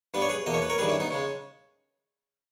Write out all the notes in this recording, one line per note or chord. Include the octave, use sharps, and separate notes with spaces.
G2 G3 B3 B4
C#5
G#4 B4
E2 B2 A#3 D#5
C#5
B4
A#4 C#5
G2 D#3 G3 G#4 B4
C#4 E4
B3 D#4
C#3 G#3 C#4